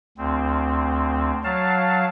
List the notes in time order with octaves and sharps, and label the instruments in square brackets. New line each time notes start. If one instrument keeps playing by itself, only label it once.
[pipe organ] D2 C4
F#3 F5 A5